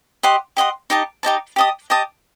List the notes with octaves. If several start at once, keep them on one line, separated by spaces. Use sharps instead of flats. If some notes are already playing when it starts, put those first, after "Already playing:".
G4 D#5 F#5 C6
G4 D#5 F#5 C6
D#4 G4 D#5 A5
D#4 G4 D#5 A5
G4 D#5 A5 D#6
G4 D#5 A5 D#6